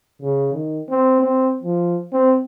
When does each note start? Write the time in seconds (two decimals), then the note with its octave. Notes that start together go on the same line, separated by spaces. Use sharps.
0.22 C#3
0.53 D#3
0.89 C4
1.21 C4
1.64 F3
2.13 C4